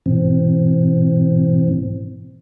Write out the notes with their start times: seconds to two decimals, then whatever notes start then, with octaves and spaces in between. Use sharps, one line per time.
0.06 G#2 B2 E3 C4